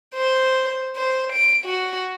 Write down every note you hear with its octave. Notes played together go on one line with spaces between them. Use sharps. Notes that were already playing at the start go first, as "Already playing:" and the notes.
C5
C5
D7
F#4